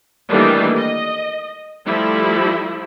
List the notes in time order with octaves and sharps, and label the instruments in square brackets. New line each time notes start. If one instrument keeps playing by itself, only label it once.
[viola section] D#3 E3 G3 A3 A#3 D4
D#5
F3 G3 A3 E4